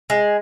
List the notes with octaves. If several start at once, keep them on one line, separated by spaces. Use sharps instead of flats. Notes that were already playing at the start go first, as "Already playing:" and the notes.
G#3